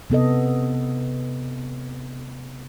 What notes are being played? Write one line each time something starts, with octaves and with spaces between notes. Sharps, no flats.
C3 B3 A4 D#5